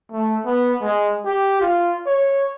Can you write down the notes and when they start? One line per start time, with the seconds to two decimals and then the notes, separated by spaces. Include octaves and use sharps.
0.12 A3
0.46 B3
0.82 G#3
1.26 G4
1.61 F4
2.07 C#5